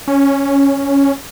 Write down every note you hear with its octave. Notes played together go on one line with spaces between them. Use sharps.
C#4